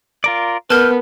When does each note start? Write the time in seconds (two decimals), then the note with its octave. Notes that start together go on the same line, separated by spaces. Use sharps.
0.24 F4 A#4 D5
0.70 B3 A#4 B4 A5 F6 G6